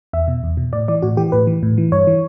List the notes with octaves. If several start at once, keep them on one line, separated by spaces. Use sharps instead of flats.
E2 E5
B2
E2
B2
A2 D5
E3 D5
A2 F#4
E3 G4
A2 B4
E3
A2
E3
G2 C#5
E3